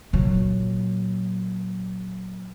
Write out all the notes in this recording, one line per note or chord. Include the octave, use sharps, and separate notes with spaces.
A#2 F#3